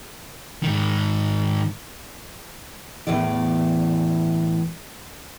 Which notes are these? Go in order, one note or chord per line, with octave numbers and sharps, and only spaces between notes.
G#2 D#3
E2 A2 A3 D5